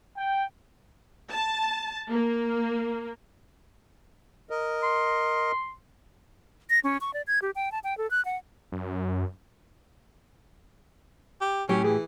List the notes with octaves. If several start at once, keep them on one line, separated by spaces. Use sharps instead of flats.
G5
A5
A#3
A#4 D#5
C6
A#6
C#4
C#6
D5
G#6
G4
G5
A5
G5
A4
F#6
F#5
F#2
G4
A2 F#3 C#4 G4
E3 G#4